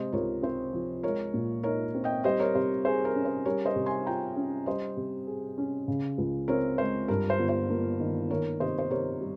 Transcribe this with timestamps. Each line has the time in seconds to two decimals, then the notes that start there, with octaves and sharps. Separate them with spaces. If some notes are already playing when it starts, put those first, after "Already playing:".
Already playing: C3 G#3 C5 D#5
0.12 C#2 A#4 C#5
0.43 C4 C5
0.73 F3
1.03 G#3 A#4 C#5
1.34 A#2
1.64 D#4 A#4 C#5
1.94 C4
2.04 D#5 G5
2.24 G3 C5 D#5
2.40 A#4 C#5
2.55 C3 C5
2.85 G#4 C5
3.05 A#4
3.15 C#4
3.25 C5
3.45 G3 A#4 C#5
3.65 C5 D#5
3.76 C3
3.86 G#5 C6
4.06 F4 G5 A#5
4.36 C#4
4.66 G3 C5 D#5
4.97 C3
5.27 G#4
5.58 C#4
5.88 C#3
6.18 C#2
6.48 C4 A#4 C#5
6.78 G#3 C5
7.08 G2 A#4
7.30 C5
7.39 G1
7.49 C5
7.70 A#3
8.00 D#3
8.30 D#3 A#4 C#5
8.60 C3 C5 D#5
8.79 C5
8.90 C3 A#4 C#5
9.21 G3